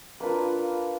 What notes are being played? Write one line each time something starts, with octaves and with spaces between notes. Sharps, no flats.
A#3 D4 F4 B4